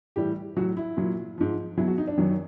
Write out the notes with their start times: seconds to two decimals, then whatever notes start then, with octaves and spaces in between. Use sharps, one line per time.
0.16 A2 E3 G3 G4
0.57 A2 F#3 F#4
0.77 E4
0.97 A#2 F#3
1.38 G#2 F3
1.78 F#3 E4
1.80 B2
1.88 F#4
1.98 D#4
2.08 D4
2.18 F#2 D#3 F#3